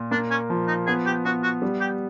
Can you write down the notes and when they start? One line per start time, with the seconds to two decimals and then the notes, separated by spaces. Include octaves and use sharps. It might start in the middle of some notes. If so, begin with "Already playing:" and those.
Already playing: A#2
0.11 A#3 D4
0.31 C#4
0.50 F3
0.68 D#4
0.87 B3 G#4
1.06 G4
1.25 B3 F#4
1.44 F#4
1.62 G3
1.81 G4